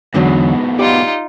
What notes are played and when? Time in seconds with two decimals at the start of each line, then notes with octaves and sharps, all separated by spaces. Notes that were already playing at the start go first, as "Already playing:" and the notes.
0.14 E2 G#2 B2 D3 F#3
0.79 D#4 F4 G4 D5